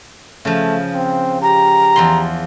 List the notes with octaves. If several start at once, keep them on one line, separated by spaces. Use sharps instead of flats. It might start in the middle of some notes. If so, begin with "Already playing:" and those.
C#3 F3 A3
C4
G4 A#5
E2 F3 C6